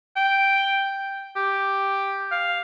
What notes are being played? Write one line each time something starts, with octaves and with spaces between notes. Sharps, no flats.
G5
G4
F5